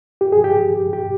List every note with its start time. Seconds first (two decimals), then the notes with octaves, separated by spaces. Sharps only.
0.21 G4
0.32 G#4
0.44 G4
0.93 G4